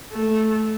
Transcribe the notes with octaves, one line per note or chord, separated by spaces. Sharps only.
A3